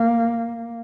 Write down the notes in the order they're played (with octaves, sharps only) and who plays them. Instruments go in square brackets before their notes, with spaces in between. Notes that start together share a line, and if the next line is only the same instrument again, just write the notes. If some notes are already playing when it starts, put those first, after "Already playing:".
Already playing: [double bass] A#3